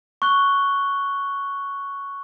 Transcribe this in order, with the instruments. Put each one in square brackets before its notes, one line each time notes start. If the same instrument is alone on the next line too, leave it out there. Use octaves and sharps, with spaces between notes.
[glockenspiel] C#6 F#6 G7